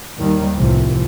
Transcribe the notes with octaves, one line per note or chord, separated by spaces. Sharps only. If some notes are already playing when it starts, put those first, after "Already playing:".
D#2 D#3 G3
C2 A2 C3 E3 F3